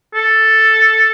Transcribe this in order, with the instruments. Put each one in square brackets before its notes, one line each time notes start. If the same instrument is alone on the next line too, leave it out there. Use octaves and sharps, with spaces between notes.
[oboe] A4